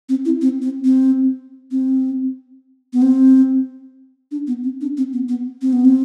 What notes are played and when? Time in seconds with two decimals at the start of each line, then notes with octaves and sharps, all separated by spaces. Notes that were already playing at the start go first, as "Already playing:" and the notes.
0.09 C4
0.25 E4
0.42 C4
0.62 C4
0.85 C4
1.71 C4
2.93 B3
3.02 C4
4.31 D4
4.47 B3
4.63 C4
4.81 D4
4.97 C4
5.13 B3
5.29 B3
5.62 C4
5.73 B3
5.85 C4